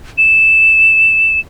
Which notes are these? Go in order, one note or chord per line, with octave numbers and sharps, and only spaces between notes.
E7